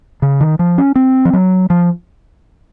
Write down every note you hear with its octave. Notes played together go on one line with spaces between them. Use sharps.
C#3
D#3
F3
C#4
C4
F3
F#3
F3